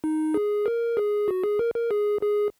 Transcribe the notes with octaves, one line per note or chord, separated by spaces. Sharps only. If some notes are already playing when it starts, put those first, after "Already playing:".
D#4
G#4
A#4
G#4
F#4
G#4
A#4
A#4
G#4
G#4